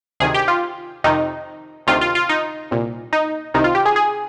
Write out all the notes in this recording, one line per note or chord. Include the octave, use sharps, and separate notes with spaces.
D2 C3 D#3 G#4
G4
F4
F2 C3 D#3 D#4
D2 C3 D#3 F4
F4
F4
D#4
C2 A#2
D#4
C2 C3 D#3 D#4
F4
G4
G#4
G#4